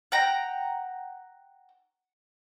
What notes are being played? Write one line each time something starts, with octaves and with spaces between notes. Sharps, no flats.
F#5 G5 A#5